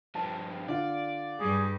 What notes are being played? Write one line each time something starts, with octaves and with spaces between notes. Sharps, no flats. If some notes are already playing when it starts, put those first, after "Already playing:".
G2 F3 A5
D3 F4 D5
G2 G3 G#4